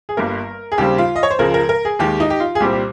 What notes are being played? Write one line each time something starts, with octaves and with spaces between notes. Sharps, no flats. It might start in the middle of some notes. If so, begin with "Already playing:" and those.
G#4
G1 G2 G3 A#3 A#4
G#4
D#2 C#3 G3 C4 G4
F4
D#5
C#5
C5
C#2 C#3 F3 G#3 A#4
A#4
A#4
G#4
D#2 D#3 G#3 G4
D#4
G4
F4
G#4
C2 A#2 G3 C4 G4
G4